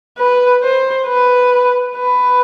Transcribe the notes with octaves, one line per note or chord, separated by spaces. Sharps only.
B4
C5
B4
B4